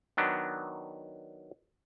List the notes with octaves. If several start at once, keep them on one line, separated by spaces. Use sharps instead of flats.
D#3 F#3 B3 D4